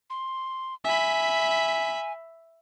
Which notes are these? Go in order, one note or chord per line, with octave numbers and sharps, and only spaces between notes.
C6
E5 G#5 B5